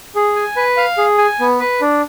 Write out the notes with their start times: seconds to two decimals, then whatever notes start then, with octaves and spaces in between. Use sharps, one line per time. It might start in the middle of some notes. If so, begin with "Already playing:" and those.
0.15 G#4
0.36 G#5
0.56 B4
0.77 F5
0.98 G#4
1.18 G#5
1.40 B3
1.60 B4
1.81 D4